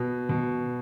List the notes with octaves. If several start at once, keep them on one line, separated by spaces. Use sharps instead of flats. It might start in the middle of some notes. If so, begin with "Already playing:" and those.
Already playing: B2
B2